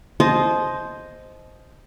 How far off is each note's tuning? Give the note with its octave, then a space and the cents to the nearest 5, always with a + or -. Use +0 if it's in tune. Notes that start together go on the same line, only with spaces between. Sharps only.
C5 +0 D#5 +0 A5 -35